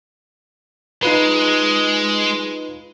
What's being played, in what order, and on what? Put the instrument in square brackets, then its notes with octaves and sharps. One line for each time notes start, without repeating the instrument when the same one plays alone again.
[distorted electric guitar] G#3 [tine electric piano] D#4 F4 B4